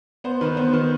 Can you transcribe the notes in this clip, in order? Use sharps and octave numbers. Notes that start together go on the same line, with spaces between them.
B3 C5
D#3 B4
B3 C5
D#3 B4